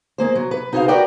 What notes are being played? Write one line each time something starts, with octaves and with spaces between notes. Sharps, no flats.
G#3 A#3 C5
F#3
B4
D#4 F#4 G#4 A4 C5 F5
F#4 A#4 B4 D5 F#5 G5